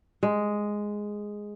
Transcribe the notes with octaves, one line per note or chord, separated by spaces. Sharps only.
G#3